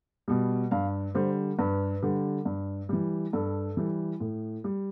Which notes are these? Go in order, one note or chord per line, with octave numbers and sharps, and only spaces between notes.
B2 G3
G2 F5
D3 G3 C5
G2 B4
D3 G3
G2
E3 G3
G2 A4
E3 G3
A2
G3